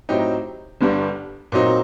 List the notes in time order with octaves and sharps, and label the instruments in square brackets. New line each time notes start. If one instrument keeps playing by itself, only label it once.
[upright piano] A2 F#3 C4 D#4 G4
G1 G2 D3 G3 D4
A#2 F#3 C4 D#4